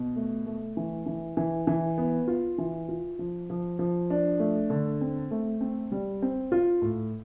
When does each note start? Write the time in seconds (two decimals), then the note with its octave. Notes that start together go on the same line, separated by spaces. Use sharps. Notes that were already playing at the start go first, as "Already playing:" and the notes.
Already playing: B2
0.16 A3
0.46 A3
0.77 E3
1.06 E3
1.37 E3
1.67 E3
1.98 B3
2.28 F4
2.58 E3
2.89 F4
3.19 F3
3.50 F3
3.79 F3
4.10 D4
4.40 A3
4.70 D3
5.01 C4
5.31 A3
5.61 C4
5.92 G3
6.22 C4
6.52 F4
6.82 A2